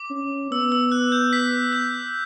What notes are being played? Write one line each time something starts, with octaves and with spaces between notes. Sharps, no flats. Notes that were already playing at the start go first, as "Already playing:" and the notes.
Already playing: D6
C#4
B3 E6
E6
F#6
G6
B6
G6